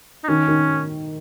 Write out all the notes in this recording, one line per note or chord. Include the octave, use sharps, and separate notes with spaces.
D#4
D#3 C#4
D#3